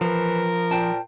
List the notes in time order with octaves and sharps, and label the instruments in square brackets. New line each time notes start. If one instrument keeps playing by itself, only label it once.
[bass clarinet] E3 [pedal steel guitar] F3 [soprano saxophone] A#4
[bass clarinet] A#2 [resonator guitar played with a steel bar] C5 G5 A5